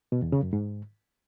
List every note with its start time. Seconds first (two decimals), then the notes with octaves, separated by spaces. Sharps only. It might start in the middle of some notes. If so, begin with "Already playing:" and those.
0.12 B2
0.22 E2
0.32 C#3
0.43 F#2
0.53 G#2